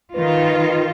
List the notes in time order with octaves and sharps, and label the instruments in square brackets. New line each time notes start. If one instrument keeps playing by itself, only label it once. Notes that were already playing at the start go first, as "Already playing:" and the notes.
[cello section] D#3 F4 [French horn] B4